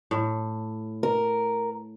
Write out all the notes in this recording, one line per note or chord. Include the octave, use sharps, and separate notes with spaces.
A2
A#4